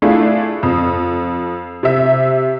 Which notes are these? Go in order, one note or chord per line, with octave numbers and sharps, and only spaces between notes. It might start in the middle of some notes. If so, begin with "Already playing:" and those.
A3 D4 E4 F4 G#4
F2
C3 E5